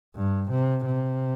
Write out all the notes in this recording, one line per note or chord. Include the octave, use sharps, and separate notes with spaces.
G2
C3
C3